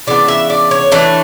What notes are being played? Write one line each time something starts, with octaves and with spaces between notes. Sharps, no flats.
C#3 E3 B3 D4 D5
E5
D5
C#5
E3 A3 D4